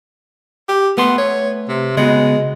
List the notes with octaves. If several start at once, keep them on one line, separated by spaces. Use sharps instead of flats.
G4
A3 B3 B4 C6
C#5
C3
C#3 G#3 B3 F#4